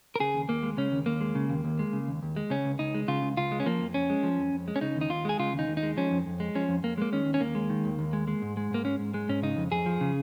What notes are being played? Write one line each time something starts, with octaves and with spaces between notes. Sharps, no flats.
A#4
C#3 G#4
D#2
D#2 A#3
G#3
C#3 C#4
D#2
D#2 A#3
G#3
C#3
D#2
D#2
G#3
C#3
D#2
D#2
G#3
C#3 C#4
C#2
C#2 D#4
G#3
C#3 F4
C#2
C#2 F4
G#3
C#4
F3 A#3
F2
F2 C#4
G#3
F3
F2
F2
G#3
C#4
C#3 D#4
D#2
D#4
D#2 F4
G#3 G#4
C#3 F4
D#2
D#4
D#2
D#4
G#3
F3 C#4
F2
F2
G#3
F3 C#4
F2
F2 A#3
G#3 A#3
D#3 C#4
D#2
C#4
D#2 A#3
G#3
D#3
D#2
D#2
G#3
G#3
G#2
G#3
G#2 A#3
G#3 C#4
G#2
G#3
G#2 C#4
C#3 D#4
F2
F2 G#4
F3
C#3